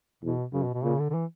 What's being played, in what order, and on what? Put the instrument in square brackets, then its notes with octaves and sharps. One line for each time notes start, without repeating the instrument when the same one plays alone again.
[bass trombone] E2 [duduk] B2
[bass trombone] F#2 [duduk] C#3
[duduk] B2
B2
[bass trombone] A#2 [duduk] C#3
[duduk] D3
D3
E3